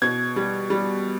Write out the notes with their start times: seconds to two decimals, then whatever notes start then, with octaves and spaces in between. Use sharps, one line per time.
0.02 B2 G#6
0.36 G3
0.70 G3